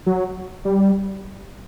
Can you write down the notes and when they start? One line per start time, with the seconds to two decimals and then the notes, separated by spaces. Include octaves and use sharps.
0.06 F#3
0.65 G3